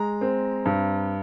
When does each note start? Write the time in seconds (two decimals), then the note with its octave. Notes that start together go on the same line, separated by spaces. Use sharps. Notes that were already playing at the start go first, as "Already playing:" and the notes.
Already playing: G#3 A#5
0.21 C4
0.65 G2